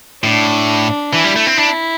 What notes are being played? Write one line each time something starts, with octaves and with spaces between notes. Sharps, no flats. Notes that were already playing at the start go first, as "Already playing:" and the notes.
A2 D4
E3 E4
G3
A3
C4
D4 E4